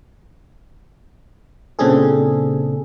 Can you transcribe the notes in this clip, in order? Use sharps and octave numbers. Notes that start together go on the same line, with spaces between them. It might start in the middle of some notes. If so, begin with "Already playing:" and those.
A#2 C#3 C4 D4 G#4 A4